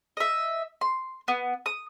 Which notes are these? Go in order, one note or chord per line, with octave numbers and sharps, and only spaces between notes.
D#5 E5
C6
B3
D#6